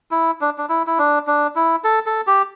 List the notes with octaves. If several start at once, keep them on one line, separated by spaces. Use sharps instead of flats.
E4
D4
D4
E4
E4
D4
D4
E4
A4
A4
G4